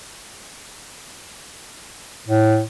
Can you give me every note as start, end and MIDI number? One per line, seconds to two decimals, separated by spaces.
2.28 2.63 45